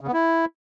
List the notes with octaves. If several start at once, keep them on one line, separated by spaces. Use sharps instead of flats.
C#3
B3
E4